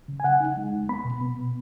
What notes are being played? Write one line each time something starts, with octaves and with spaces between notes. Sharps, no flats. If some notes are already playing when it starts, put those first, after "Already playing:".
C#3
G#5
C#3 F#5
D#4
G#3
D#2
B3 B5
B2
B3
B2